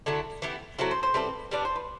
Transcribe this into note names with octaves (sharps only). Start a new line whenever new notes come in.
D3 F#3 A3 E4
E3 B3 E4 G4
F#3 A3 C4 E4 F#4
C5
C5
G3 C4 E4 A4 B4
G3 B3 D4 D5
C5
B4